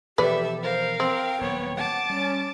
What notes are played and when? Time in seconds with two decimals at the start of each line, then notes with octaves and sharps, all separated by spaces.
0.18 B2 E3 F3 G4 A4 B4 D5 E5
0.63 A#4 C5 F5
1.00 C4 G5
1.41 D#1 F#3 B3 C#5
1.77 F#5 A5 D6
2.10 G3 C#4